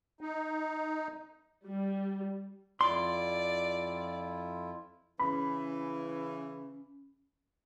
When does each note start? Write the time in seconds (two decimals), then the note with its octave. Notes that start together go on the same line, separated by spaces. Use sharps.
0.21 D#4
1.66 G3
2.81 F2 E4 F4 D5 C6
5.19 C#3 E3 C#4 B5